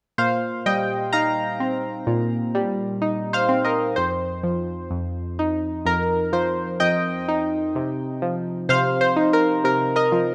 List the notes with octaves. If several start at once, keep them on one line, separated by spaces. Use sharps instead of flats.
A#2 C5 F5
G3 D#5 G5
D#4 F5 A#5
C4
A#2
G3
D#4
C5 F5
C4
A#4 D#5
F2 C5
F3
F2
D#4
F2 A#4
F3 C5
F2 D#5 G5
D#4
C3
F3
C3 C5 F5
C5
D#4
A#4
C3 A#4
A#4 D#5
F3